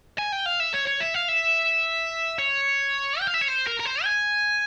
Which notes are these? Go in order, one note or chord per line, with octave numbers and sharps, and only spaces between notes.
G#5
G5
F5
E5
C#5
C#5
E5
F5
E5
C#5
G5
F5
E5
C#5
C5
A#4
A#4
C5
G#5